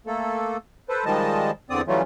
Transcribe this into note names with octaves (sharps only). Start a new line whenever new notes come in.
A3 A#3 A4
A4 B4 C5
D#3 F3 G3 G#3 D#5 A5
E2 D3 C4 D5 D#6
E3 F#3 G3 A3 C#4 F4